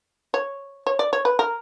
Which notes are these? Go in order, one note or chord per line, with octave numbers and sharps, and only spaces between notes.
C#5
C#5
D5
C#5
B4
A#4